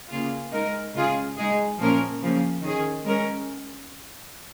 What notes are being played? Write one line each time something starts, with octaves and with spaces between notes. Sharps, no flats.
C#3 A#3 F4 G#4
G#3 D#4 A#4
C#3 G#3 F4 G#4
G#3 D#4 G#4
A#2 F3 A#3 C#4 A#4
C#3 F3 A#3 C#4
D#3 C#4 G#4
G#3 C#4 A#4